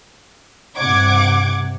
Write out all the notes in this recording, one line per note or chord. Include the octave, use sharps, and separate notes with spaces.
G2 C3 F#5 D6 G#6